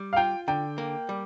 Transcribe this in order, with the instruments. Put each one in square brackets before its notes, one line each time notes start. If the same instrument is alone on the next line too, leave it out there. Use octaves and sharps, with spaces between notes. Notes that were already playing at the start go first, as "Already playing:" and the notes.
Already playing: [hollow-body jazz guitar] G3
[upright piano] F5
[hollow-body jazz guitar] F4 [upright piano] G5
[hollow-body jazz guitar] D3 [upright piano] G5
[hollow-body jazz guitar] A#3
G3